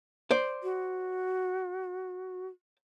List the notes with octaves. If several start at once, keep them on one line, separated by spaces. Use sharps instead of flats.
C5 D5
F#4